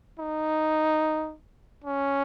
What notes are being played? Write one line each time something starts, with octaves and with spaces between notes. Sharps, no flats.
D#4
C#4